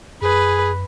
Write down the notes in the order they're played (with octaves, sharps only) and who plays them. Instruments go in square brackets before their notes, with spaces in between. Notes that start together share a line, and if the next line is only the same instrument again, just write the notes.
[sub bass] F#2 [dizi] G#4 [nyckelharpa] B4